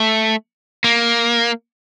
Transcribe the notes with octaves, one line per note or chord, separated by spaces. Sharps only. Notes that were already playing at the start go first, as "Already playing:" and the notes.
Already playing: A3
A#3